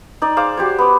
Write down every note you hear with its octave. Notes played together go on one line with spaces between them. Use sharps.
D#4 D5
G#4 C5 F5 D6
F#4 G4 C5 C#5
B3 D6